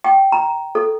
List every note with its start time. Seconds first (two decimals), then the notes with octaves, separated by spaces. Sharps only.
0.04 G5
0.32 A#5
0.75 A4